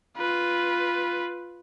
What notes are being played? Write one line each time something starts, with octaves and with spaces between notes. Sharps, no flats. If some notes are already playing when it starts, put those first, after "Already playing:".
F4 B4